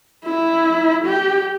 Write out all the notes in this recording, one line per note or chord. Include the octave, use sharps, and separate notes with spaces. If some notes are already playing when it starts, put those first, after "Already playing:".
E4
G4